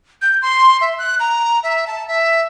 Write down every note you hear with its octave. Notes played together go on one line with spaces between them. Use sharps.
G6
C6
E5
F#6
A#5
E5
A5
E5